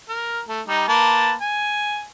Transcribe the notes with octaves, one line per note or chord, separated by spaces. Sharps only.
A#4
A3
G3 D#4
A#3 B4 A5
G#5